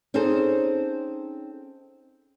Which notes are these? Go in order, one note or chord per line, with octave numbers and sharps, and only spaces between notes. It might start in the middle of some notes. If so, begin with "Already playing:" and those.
C4 C#4 D#4 G#4 A4 C5